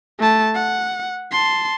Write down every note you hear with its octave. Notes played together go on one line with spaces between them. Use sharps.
A3 A5
F#5
A5 C6